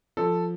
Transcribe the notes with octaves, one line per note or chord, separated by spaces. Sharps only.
F3 A4